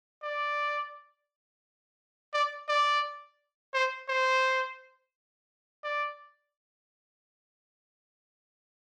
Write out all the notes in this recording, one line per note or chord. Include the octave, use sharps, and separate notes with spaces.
D5
D5
D5
C5
C5
D5